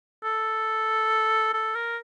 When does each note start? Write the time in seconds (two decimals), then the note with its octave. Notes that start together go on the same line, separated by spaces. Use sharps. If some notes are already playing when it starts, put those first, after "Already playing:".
0.24 A4
1.54 A4
1.75 A#4